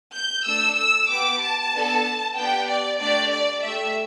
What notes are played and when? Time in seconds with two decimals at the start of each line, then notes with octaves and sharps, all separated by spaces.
0.15 G6
0.46 A3 D4 A4 E6
0.78 E6
1.10 B3 G4 D6
1.42 A5
1.74 B3 D4 A4
2.37 B3 D4 G4 G5
2.69 D5
3.00 A3 D4 G4 D5
3.33 D5
3.64 A3 G4 E5